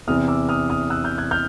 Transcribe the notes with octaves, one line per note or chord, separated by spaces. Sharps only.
E2 C3 E3 D#6 F6
D6 E6
D#6 F6
D#6 F6
E6 F#6
F6 G6
F#6 G#6
F6 G6